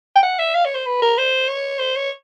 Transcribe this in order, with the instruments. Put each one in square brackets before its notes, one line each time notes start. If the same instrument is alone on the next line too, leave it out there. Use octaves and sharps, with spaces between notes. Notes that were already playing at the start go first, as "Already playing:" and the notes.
[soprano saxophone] G5
F#5
E5
F5
C#5
C5
B4
A#4
C5
C#5
C5
C#5